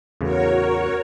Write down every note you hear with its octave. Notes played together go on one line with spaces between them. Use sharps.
E2 A2 C#3 F#4 A#4 C#5